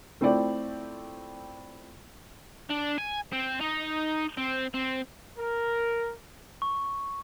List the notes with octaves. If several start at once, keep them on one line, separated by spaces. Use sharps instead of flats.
A3 C4 E4 F4 D5 G5
D4
G#5
C4
D#4
C4
C4
A#4
C#6